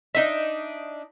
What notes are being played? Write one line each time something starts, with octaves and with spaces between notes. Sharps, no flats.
D4 D#4 E5